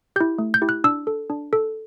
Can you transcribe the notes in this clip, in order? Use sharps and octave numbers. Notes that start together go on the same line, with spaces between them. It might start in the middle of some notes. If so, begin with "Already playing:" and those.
E4 G4 G6
A3
G6
E4 G4
F#6
D4 E6
A4
D4
A4